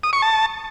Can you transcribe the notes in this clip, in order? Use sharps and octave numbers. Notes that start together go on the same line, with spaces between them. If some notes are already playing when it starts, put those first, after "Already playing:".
D#6
C#6
A5